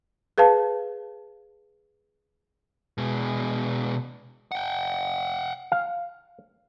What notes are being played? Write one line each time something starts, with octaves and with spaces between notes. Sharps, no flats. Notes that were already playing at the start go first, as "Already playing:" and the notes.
G#4 B4 F5 A5
B2 G#3
F#5 G5
F5